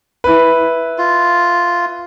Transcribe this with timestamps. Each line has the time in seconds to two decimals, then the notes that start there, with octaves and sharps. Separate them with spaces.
0.24 E4 B4
0.98 F4